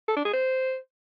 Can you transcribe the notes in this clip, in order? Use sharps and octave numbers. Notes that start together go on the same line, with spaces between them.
A4
D4
G#4
C5